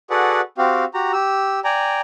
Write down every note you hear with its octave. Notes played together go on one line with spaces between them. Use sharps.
F#4 G#4 A4 B4 D5 F#5
C4 F#4 G4 F5
F#4 G4 A#5
G4 E6
D5 G5 G#5 A#5